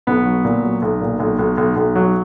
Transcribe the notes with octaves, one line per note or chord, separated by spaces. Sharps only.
B1 B3
F#3
A#2
F#3
B1
A#2
B1
B1
B1
B1
F#3